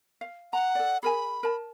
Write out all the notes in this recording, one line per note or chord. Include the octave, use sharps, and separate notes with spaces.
F5
F#5 A#5
A4 D5
G#4 A#4 G#5 B5
A#4 A5